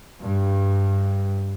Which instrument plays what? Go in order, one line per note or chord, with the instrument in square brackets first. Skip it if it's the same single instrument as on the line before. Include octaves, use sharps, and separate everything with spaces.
[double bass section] G2